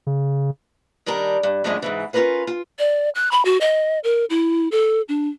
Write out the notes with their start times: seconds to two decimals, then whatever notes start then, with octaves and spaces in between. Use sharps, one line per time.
0.07 C#3
1.06 D#3 G3 D4 A#4
1.43 G2
1.64 F#2 A2 D#3 F3 G#3 D4
1.82 G#2 C#3 E3
2.13 C#4 F4 G#4 A#4 B4 F5
2.47 F4
2.79 D5
3.15 F#6
3.31 B5
3.45 F#4
3.61 D#5
4.04 A#4
4.30 E4
4.72 A4
5.09 D4